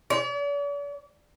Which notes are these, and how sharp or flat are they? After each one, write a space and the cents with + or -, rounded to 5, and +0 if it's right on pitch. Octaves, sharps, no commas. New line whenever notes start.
D5 -45